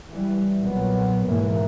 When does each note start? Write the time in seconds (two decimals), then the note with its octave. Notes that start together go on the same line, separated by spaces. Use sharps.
0.10 E3 G3
0.59 B1 A#2 F#3 B3
1.24 G#2 B2 E3 A#3